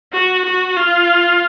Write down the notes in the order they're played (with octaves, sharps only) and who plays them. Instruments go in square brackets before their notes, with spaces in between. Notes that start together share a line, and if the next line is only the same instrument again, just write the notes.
[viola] F#4
F#4
F4